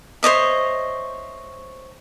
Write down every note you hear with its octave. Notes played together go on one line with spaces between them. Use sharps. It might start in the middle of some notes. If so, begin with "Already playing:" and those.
C5 C#5 D#5 E5